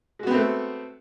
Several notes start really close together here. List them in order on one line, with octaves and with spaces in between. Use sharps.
G#3 F#4 B3 C4 A3